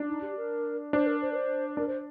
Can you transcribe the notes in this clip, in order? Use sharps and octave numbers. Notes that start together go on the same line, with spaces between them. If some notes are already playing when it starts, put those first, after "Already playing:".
Already playing: D4
D#4
G4
A#4
D4 C5
A#4
C5
A#4
C5
D4 A#4
C5